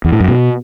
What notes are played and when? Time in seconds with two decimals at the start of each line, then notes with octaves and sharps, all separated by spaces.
0.04 E2
0.12 A2
0.20 F#2
0.28 B2